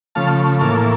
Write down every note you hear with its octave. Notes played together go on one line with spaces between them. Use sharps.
C#3 F3 A3 F5 A5
A2 E3 A#3 F5 A5